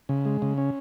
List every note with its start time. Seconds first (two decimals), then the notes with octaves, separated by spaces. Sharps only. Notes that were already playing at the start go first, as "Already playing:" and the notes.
0.09 C#3
0.25 G#3
0.42 C#3
0.58 C#4